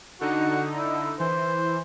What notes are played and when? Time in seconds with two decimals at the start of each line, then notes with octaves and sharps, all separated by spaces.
0.21 D3 D#4 F#4
0.77 E4
1.20 E3 C5